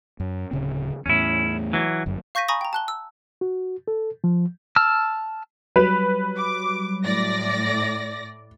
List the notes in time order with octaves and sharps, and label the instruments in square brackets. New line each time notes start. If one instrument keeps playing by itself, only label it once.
[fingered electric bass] F#2
D1 C#3 C4
[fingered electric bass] E2 A2 [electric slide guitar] C#4 E4
[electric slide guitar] E3 F#3
[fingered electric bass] G1 F#2
[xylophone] F5 C#6 G6 A#6 B6 D#7
G#5 A#5 B5 C#6 D#6 A#6
G5 A#5
A5 F#6 G7
E6
[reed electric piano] F#4
A4
F3
[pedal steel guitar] A5 E6 F6
[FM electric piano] F#3 G3 [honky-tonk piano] B4
[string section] D6
A2 D5 A#6